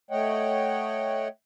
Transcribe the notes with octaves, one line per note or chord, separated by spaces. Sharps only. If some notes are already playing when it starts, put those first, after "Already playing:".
A3 C#5 D#5 F#5 G5